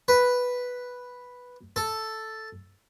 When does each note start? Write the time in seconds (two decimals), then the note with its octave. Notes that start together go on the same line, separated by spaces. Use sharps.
0.08 B4
1.76 A4